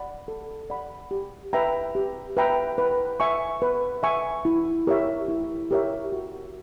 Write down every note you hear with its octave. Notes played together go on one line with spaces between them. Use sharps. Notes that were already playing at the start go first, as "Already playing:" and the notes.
Already playing: D5 F#5 B5
A4
D5 F#5 B5
G4
B4 E5 G5 A#5
G4
B4 E5 G5 A#5
B4
E5 G#5 C#6
B4
E5 G#5 C#6
E4
G4 A#4 C#5 E5
E4
G4 A#4 C#5 E5
F#4